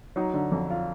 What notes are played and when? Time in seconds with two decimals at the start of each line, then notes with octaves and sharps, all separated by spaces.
0.16 F#3 D#4
0.34 D3
0.52 F2
0.70 F4